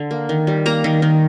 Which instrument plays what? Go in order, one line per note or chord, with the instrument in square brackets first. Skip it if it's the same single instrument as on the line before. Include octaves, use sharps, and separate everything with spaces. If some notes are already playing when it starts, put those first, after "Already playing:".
Already playing: [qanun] D3
A#3
D#3
G3
A#3 A#5
D#3
D#3